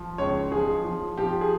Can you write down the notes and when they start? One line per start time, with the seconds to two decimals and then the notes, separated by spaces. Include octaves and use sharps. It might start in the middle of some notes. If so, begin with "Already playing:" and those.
Already playing: F3
0.18 C#2 C#5
0.51 F3 G#4
0.85 F3
1.18 F3 G4
1.41 G#4